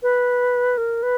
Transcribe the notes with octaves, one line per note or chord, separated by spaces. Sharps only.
B4
A#4
B4